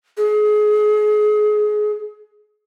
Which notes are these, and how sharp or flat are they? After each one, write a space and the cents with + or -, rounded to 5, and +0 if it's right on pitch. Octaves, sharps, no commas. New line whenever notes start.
G#4 +25